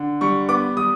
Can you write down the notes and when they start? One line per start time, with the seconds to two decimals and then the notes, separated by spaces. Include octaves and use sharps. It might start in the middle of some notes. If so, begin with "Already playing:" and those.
Already playing: D3
0.21 G3 C#6
0.49 B3 D6
0.76 G3 D#6